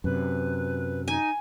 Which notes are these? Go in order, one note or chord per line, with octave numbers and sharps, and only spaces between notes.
F#2 C3 B4
D#4 G#5